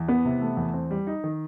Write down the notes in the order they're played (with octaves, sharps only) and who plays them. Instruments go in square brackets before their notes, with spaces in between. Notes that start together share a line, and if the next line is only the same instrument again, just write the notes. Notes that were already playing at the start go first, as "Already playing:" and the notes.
Already playing: [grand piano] E2
[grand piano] E3 [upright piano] B3
[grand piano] C3
A3
E2
C4
G3
D#4
D#3